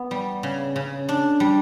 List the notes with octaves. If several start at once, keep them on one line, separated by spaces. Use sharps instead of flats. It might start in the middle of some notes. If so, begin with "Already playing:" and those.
Already playing: B3
G3
C#3
C#3
D4
G3